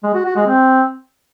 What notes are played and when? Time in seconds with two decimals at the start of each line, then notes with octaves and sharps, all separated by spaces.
0.03 G#3
0.14 F#4
0.25 F#4
0.36 G#3
0.47 C4